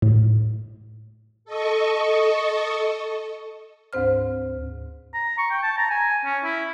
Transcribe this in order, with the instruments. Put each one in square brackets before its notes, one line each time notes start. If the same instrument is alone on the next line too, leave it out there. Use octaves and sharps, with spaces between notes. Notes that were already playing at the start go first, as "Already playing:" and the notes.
[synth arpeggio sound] A2
[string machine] A4 D#5 C#6
[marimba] D2 G#2 C4 C5 F6
[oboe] A#5
C#6
G5
A5
A#5
G#5
C#4
E4